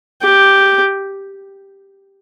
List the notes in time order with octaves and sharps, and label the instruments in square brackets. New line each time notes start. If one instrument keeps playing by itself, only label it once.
[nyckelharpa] G4